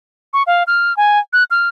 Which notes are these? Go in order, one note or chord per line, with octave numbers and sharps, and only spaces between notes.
C#6
F5
F6
G#5
F#6
F6